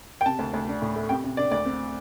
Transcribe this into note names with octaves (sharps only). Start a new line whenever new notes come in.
G5
C3 A5
D2
D2
D4
A2
A3
C3 G5
C3
D4 D5
D2 D5
C4